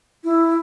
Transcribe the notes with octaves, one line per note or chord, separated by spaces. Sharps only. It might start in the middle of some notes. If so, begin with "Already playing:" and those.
E4